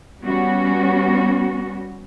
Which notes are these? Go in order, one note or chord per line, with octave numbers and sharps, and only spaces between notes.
G3 B3 C#4 F#4